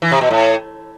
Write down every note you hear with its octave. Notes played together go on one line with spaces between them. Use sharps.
E3
C3
B2
A2